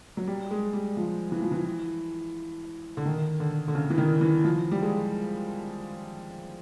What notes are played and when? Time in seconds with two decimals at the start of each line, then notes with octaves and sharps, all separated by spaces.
0.17 F#3
0.27 G3
0.51 G#3
0.73 G3
0.97 F3
1.32 E3
1.42 F3
1.52 E3
2.97 D3
3.06 D#3
3.40 D3
3.68 D3
3.75 C#3
3.90 E3
3.98 D#3
4.21 E3
4.44 F3
4.71 G3
4.82 G#3